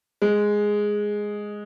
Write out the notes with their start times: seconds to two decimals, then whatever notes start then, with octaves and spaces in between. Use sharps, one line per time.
0.22 G#3